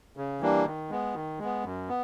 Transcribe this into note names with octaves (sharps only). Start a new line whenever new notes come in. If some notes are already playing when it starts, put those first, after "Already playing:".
C#3
E3 G3 A#3 D4
D#3
G#3 B3
D#3
G#3 B3
F#2
B3